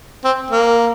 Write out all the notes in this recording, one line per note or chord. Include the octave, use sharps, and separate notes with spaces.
C4
A#3